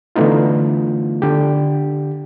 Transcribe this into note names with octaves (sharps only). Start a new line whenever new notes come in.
D3 E3 A3 B3 D#4 F4
D3 G4